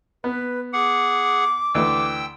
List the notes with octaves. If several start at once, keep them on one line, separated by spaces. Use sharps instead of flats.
B3 B4
G#4 F#5 D6
D2 E3 G5 E6